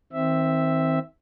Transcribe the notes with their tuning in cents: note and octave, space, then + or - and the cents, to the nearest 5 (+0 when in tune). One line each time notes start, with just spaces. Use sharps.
D#3 +40 C4 +0 E5 +0